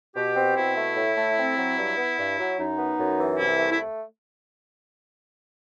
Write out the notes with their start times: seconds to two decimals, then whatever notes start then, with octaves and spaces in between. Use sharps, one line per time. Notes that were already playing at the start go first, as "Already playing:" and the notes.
0.16 B2 G4
0.36 C4
0.56 B2 E4
0.77 A3
0.96 A2
1.17 A3
1.37 C4
1.57 F#3
1.77 G2
1.97 B3
2.18 G2
2.38 F#3
2.58 F#2 D#4
2.78 B3
2.98 F#2
3.18 E3
3.38 C2 E4
3.58 A3
3.70 E4